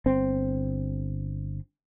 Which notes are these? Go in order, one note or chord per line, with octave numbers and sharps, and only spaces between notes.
G1 C4